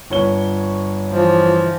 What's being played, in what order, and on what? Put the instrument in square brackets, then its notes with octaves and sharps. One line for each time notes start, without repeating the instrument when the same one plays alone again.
[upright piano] G1 C#5 G7
[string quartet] E3 F3